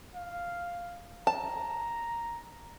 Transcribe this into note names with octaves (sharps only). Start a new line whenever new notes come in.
F5
A5 A#5